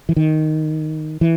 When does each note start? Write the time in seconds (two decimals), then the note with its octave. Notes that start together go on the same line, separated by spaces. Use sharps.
0.09 E3
0.16 D#3
1.21 E3